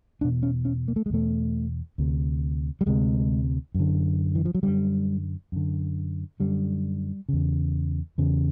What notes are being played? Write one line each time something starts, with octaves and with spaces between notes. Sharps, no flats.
E2 B2 D4
C#4
C#4
A#3
A3
G#3
E2 B2 A3
D2 C3
G3
D2 C3 G#3
F#2 D3
E3
F3
F#3
F#2 D3 G3
F#2 D3
F#2 D3 G3
E2 C#3
E2 C#3